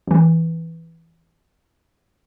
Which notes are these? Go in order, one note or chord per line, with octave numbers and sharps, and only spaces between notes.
A1 E3